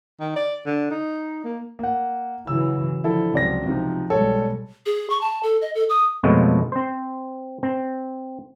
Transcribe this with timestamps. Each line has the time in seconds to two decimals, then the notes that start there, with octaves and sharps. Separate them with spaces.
0.20 D#3
0.36 D5
0.66 D3
0.91 D#4
1.44 A#3
1.79 A#3 F#5
2.47 C#3 E3 F#3 E6
3.04 D3 F3 E4 A4
3.34 C#2 C3 F3 F#3 D5 A#6
3.66 C3 F3 D#4
4.10 B1 G3 G#3 A4 C#5
4.86 G#4
5.10 C#6
5.21 A5
5.43 A4
5.62 D#5
5.75 A4
5.89 D#6
6.23 F2 B2 F3 F#3 G#3 A3
6.72 C4 C5
7.63 C4